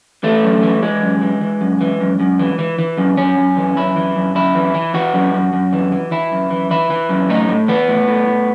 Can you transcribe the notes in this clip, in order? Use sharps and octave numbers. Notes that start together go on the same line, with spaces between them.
E3 A3
F#2
E3
E3 G#3
F#2
E3
E3
F#2
E3
F#2
F#2
E3
E3
E3
F#2
F#2 C#4
F#2
E3
F#2 E4
E3
F#2
F#2 E4
E3
E3
E3 F#4
F#2
F#2
F#2
E3
E3
E3 E4
F#2
E3
E3 E4
E3
F#2
A2 D#4
A2
E3 B3
A2
A2
A2